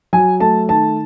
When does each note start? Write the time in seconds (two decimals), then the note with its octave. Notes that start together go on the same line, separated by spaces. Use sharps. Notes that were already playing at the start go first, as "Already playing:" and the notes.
0.13 F#3 G#5
0.40 A3 A5
0.69 D#3 A5